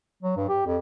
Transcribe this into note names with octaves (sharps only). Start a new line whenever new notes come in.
F#3
G2
G4
F2